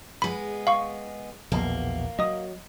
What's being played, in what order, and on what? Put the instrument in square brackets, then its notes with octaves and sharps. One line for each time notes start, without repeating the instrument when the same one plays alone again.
[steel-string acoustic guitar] G#3 B3 [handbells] B5
[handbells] F5 C#6
[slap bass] A#1 E2 B2 [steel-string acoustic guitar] A#3
[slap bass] F#3 [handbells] D#5 D#6